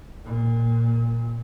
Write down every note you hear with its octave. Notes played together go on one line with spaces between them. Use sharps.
A#2